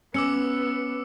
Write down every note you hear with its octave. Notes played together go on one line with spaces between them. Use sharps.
B3 C#4 D6 E6 C#7